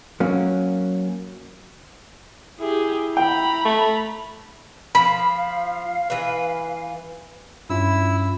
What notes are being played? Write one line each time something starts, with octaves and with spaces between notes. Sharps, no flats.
F#3 A#3 C#4
E4 G4 G#4
G5 A#5 B5
A3
F3 F5 B5
E3 B4
G2 C#4 E4 F4 E6